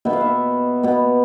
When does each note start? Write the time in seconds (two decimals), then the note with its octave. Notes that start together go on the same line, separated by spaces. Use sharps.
0.05 B2 B3 E5
0.13 F5
0.21 E5
0.83 B2 B3